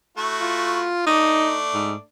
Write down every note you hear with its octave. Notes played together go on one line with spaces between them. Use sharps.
A3 E4 F#4
F4
A3 D4 D#4
G#2